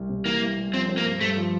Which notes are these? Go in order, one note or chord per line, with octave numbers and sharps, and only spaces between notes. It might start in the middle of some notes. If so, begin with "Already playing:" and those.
Already playing: C2
C3
E3 A#3
C2
C2
F3 C4
C4
A#3
G2
G2 A3
F3